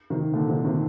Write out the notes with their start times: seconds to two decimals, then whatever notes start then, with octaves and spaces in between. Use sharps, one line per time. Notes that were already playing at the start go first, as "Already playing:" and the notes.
0.10 C3 D#3
0.34 A#2 D3
0.49 C3 D#3
0.64 C3 D#3